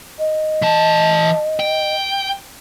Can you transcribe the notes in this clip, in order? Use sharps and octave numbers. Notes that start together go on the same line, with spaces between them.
D#5
E3 A5
G5